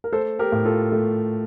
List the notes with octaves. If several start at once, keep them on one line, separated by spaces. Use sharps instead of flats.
A#4
A3 A4 C5
G4 A#4
A2
F4 A4
A3